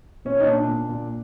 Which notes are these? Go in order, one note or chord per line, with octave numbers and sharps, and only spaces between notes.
A#2 C#4
D#4
A#2 D4
A#2
A#2